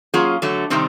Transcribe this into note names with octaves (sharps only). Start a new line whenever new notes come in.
F#3 A#3 C#4 F4 G#4
D3 F#3 A3
C3 D#3 G3 C4